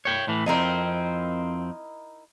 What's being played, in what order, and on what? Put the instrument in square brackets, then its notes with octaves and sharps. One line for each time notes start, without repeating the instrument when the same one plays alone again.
[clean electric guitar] C#5 G5
A2 E3
[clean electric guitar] F2 C4 [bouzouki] D#4 E4 A#4